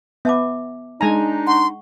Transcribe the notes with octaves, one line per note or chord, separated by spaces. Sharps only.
B3 E5 A5 D6
G#3 D4 D#4 G#5 A#5
F#5 C6 C#6